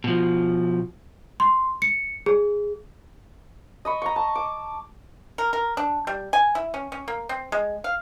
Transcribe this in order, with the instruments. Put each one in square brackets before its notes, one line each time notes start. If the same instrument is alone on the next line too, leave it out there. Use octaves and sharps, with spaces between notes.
[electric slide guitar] B2 F3
[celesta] C6
C#7
G#4
[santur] D#5 B5 C#6
A#5 C#6
A5
D6
[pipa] A#4
A#4
D4
G3
G#5
E4
C#4
C#4
A#3
C4
G#3
F5